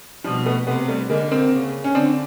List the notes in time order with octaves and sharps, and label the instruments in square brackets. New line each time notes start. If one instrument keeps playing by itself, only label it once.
[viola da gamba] B2 [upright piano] F3 G3
[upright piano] A3 B3
[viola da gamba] C3 [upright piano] A3 B3
[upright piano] G3 A3
[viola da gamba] D3 [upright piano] G#3 A#3
[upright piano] A#3 C4
[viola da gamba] C#3
[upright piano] C#4
[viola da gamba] D3 [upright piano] C4 D4